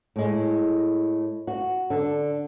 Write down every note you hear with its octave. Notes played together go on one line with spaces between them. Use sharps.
A2 G#3
F#4
D3 D4